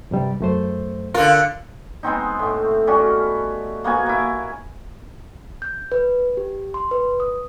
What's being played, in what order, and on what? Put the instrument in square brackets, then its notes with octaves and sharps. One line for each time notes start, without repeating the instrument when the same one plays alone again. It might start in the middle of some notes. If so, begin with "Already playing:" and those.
[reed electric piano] G2 C3 G3
F#2 A3 C5
[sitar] D3 F4 [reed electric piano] A#4
[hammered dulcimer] G#3 B3 C4 D#4
A2 A3
G3 C#4 F#4
A#3 B3 F#4 G#5
A#3 E4
[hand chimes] G6
B4
G4
C6
B4
D#6